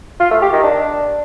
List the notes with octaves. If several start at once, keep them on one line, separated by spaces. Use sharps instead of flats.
F4
A3
G4
D#3
D4